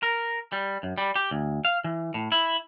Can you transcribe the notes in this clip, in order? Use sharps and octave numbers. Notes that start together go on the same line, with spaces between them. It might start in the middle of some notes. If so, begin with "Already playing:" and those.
A#4
G3
F#2
G3
G4
D2
F5
E3
A2
E4